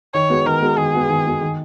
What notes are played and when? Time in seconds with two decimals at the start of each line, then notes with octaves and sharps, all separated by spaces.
0.14 D#3 C#5
0.30 G#3 B3 F#4
0.46 D#3 A#4
0.62 G#3 B3 F#4
0.78 D#3 G#4
0.94 G#3 B3 F#4
1.09 D#3
1.26 G#3 B3 F#4
1.41 D#3